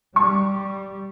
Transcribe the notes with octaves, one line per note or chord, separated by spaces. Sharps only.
G3 C#6